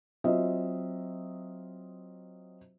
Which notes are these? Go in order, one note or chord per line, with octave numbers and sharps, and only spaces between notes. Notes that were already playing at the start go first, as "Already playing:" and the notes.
F#3 C4 F4 D#5 E5